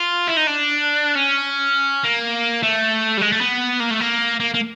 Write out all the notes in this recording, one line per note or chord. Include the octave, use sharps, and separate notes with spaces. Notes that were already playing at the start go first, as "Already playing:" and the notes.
Already playing: F4
E4
D#4
D4
C#4
A#3
A3
G3
G#3
A3
B3
A#3
A3
A#3
A#3
A#3